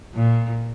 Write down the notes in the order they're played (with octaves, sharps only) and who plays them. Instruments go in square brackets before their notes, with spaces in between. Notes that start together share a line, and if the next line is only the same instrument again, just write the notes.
[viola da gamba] A#2